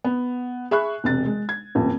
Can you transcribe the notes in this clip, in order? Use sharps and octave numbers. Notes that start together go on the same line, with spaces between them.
B3
G#4 E5 B5 C#6 F#6
E1 C3 A6
G#3
G#6
D#1 A1 F2